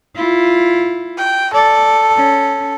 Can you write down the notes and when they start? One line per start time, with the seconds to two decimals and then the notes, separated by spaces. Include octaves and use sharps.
0.15 E4 F4
1.18 G5
1.54 A4 D5
2.17 C#4